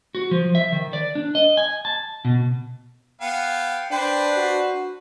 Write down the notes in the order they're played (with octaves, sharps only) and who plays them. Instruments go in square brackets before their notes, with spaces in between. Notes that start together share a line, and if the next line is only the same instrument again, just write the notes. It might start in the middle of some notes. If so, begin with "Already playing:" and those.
[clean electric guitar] F#4
F3
E5
D#3
D5
D4
D#5
G#5
A5
B2
[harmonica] B3 F5 [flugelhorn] G5
[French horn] D4 [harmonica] B4 C5 [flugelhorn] G5
[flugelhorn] F#4